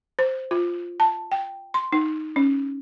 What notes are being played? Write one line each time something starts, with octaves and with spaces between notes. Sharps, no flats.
C5
F4
A5
G5
C6
D#4
C#4